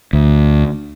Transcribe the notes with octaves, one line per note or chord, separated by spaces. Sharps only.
D2